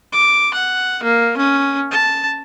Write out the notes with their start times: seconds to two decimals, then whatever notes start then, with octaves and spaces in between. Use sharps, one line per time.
0.12 D6
0.53 F#5
1.03 A#3
1.37 C#4
1.91 A5